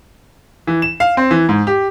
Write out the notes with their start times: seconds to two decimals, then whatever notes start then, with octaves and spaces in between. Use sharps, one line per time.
0.67 E3
0.82 E7
1.00 F5
1.17 C4
1.31 E3
1.49 G#2
1.67 G4